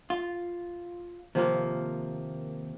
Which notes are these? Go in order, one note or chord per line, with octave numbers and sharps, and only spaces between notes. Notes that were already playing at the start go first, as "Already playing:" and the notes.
F4
D#2 C3 F3 A#3